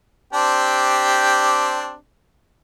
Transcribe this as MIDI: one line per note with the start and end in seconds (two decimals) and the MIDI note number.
0.33 1.95 60
0.33 1.95 62
0.33 1.95 67